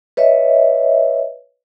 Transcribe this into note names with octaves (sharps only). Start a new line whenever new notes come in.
B4 C#5 D#5 E5